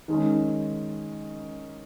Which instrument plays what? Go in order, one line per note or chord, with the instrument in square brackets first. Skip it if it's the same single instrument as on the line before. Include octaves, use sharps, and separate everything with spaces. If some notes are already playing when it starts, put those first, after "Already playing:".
[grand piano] D#3 G#3 C#4